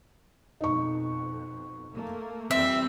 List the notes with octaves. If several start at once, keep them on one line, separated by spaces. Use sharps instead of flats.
F2 B2 D#4 C#6
A3 A#3
F2 E3 G3 C4 E5